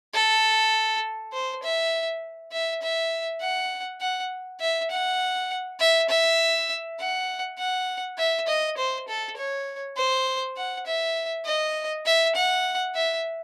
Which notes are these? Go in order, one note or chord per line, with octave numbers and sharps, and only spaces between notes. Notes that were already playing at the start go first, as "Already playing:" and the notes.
A4
C5
E5
E5
E5
F#5
F#5
E5
F#5
E5
E5
F#5
F#5
E5
D#5
C5
A4
C#5
C5
F#5
E5
D#5
E5
F#5
E5